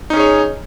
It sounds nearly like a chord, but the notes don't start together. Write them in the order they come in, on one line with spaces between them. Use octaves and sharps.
D#4 C#4 G#4 C#5